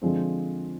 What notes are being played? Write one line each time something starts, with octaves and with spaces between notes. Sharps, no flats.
D3 F3 G#3 C4